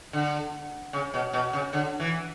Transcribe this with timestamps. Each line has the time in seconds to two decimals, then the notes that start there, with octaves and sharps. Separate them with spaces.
0.13 D3
0.93 C#3
1.14 B2
1.33 B2
1.53 C#3
1.73 D3
2.00 E3